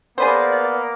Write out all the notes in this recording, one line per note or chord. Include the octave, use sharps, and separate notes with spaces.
A#3 B3 G#4 B4 C5 D5